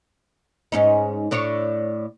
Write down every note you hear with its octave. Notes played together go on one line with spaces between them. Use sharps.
G#2 C#4 D#4
A2 D4 C#5